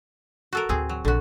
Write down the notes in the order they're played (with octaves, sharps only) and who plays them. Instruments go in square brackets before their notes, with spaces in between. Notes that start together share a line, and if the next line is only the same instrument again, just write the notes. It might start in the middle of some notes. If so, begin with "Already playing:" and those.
[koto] F#4 A4 A#4
[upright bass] D2 A2 [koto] C4 G#4
[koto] F#3
[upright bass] A#1 [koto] D3 F#4